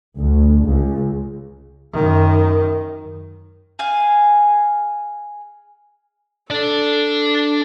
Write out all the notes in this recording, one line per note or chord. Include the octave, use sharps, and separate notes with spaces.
D2
C#2
F#2 D#3
G#4 F5 G#5
D4 A4 D5